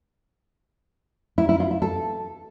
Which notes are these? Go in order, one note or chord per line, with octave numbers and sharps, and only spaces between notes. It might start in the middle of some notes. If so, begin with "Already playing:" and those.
E4
E4
F4
E4
A4